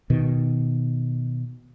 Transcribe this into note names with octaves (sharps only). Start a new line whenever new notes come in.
B2 D#3